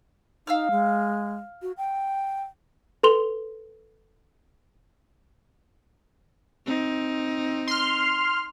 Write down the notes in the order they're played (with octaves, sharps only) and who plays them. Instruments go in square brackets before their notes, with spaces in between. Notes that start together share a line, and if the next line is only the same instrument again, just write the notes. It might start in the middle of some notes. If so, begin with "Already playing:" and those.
[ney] D#4 [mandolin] F5 E6 F6
[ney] G#3
F#4
G5
[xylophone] A4 B4 C6 F7 G7
[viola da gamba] C4 D#4
[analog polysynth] C6 F6